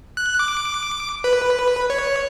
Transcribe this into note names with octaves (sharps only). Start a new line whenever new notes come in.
F#6
D6
B4
C#5